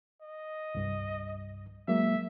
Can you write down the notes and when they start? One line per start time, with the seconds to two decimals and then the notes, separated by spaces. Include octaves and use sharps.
0.22 D#5
0.75 C2 G2
1.88 F#3 G#3 A#3 E5